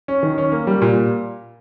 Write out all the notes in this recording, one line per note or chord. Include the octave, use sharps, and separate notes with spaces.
C#4
D#3
C#4
A#3
G3
A#2